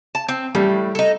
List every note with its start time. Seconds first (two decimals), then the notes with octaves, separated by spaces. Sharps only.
0.15 A5
0.29 C4
0.55 A2 G3
0.95 D#4 A4